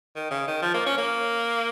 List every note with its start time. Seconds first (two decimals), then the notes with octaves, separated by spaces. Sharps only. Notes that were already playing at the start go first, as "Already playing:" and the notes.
0.16 D#3
0.31 C#3
0.48 D#3
0.62 F3
0.74 A#3
0.86 C#4
0.98 A#3